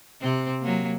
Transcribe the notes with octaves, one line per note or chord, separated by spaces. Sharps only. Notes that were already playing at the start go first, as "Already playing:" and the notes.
C3 C4
F#3 A#3